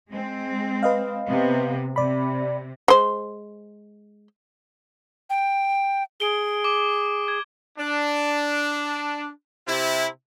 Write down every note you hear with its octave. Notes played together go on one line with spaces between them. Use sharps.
G#3 C4
B4 D#5 F5
C3 B3
C3 D5 B5
G#3 C5
G5
G#4 D7 G7
D6
G#6
D4
C3 E4